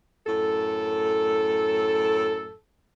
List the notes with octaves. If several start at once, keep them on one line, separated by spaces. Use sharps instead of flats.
F#2 A2 A4